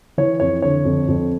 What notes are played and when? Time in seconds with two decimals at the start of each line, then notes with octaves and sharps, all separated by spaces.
0.18 E3 C#5
0.40 F2 C#5
0.62 D3 C#5
0.85 F2
1.08 F2